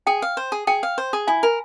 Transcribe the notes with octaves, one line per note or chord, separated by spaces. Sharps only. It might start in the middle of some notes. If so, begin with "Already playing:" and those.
G#4 G5
F5
C5
G#4
G#4 G5
F5
C5
G#4
E4 G#5
A#4